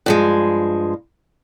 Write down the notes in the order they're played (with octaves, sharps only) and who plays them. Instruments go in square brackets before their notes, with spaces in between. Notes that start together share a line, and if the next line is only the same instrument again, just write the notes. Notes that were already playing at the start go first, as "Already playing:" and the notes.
[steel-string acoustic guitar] G2 F3 G#3